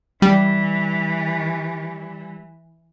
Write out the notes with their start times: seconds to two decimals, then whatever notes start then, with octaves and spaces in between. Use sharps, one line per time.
0.22 E3 G3